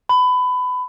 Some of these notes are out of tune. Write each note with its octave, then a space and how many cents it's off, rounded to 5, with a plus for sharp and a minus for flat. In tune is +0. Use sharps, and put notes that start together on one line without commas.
B5 +25